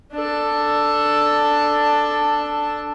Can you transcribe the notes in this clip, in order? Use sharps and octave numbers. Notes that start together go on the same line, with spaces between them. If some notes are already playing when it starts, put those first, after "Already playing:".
D4 A4